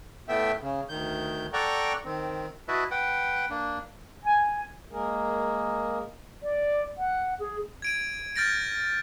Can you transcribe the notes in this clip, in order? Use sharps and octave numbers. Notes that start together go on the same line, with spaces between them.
A2 A3 B3 E5 G5
C#3
D2 D#3 G6
A4 D5 F#5 G5 A#5 C#6
D#3 C4
E4 F#4 B4 D#5 E5 A5
B4 F#5 G5
A#3 D4
G#5
G#3 A#3 G#4 A#4
D5
F#5
G#4
G#6 D7 D#7
F6 G6 A6 A#6 D7